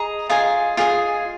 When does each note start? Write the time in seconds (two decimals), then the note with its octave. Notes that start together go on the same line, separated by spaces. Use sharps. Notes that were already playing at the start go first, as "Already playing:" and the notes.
Already playing: G#4 D#5 A#5
0.30 F4 G#4 D#5 G#5
0.77 F4 G#4 D#5 G#5